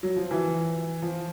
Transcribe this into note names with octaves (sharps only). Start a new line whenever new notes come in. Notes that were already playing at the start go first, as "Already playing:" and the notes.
F#3
F3
E3
F3